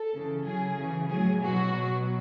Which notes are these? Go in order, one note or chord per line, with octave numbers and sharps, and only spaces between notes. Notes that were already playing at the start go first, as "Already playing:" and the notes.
Already playing: A4
C#3 E3
C#3 F#3 G#4
C#3 E3
A2 F#3 G#4
B2 F#3 F#4
B2 F#3